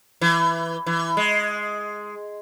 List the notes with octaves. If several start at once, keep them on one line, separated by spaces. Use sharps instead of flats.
E3
E3
G#3